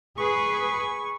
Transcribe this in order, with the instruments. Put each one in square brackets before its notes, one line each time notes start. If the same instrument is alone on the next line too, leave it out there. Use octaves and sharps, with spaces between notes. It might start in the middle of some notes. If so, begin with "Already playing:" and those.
[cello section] G#4 B4 [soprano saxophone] C#6